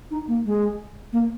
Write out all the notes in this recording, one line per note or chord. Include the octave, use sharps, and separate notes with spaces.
D#4
A#3
G#3
A#3